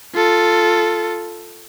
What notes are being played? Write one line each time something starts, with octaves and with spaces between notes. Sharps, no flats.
F4 A4